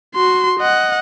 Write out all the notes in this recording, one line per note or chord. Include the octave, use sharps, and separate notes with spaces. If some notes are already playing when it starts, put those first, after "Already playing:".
F#4 C6
D#5 F#5